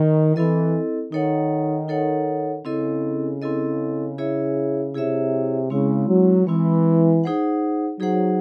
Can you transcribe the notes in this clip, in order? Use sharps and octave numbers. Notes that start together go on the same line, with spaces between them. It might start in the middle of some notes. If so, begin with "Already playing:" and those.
Already playing: D#3
E3 C4 E4 A4 D#5
D#3 D#4 A4 C#5 F#5
D#4 A4 C#5 F#5
C#3 C4 E4 A4 D#5
C4 E4 A4 D#5
E4 G#4 C#5 E5
C3 E4 G#4 C#5 E5
C#3 G#3 C4 E4
F#3
E3 G#3 C4 E4
D#4 G#4 C5 F#5
F#3 D#4 G#4 C5 F#5